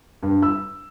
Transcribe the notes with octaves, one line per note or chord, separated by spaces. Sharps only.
G2
E6